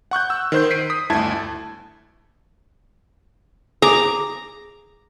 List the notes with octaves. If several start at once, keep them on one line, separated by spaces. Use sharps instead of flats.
F#5 C#6 F#6 G6
E6
D#3 C5 G6
B6 C7 D7 D#7
D#6 B6
G1 D2 E4 A5 G#6
G#4 A#5 D6